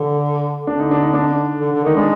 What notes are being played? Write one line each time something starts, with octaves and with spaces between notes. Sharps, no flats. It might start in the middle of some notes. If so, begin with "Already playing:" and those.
Already playing: D3
D3 D4
D#4
D4
D#4
D4
D3
D3
D#3 D#4
G#3 D4